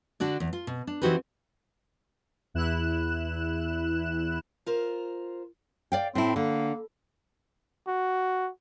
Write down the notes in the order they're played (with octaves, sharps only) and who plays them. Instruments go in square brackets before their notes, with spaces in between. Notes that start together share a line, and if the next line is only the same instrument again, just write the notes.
[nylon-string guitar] D3 D4 F#4 D5
E2
F4
B2
D4
E3 C4 D#4 F#4 G4 B4
[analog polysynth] E2 E4 F#6 E7
[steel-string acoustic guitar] F4 A#4 C5
[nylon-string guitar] D5 F5 G5
[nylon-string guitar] A2 E4 [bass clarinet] C4
[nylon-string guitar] D3 [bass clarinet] A#3
[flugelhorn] F#4